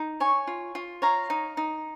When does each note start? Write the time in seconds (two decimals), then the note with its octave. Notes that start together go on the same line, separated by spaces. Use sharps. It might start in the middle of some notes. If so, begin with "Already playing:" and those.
Already playing: D#4
0.20 C#5 G#5 C#6
0.47 F4
0.75 F4
1.02 C#5 F5 A#5
1.30 D#4
1.57 D#4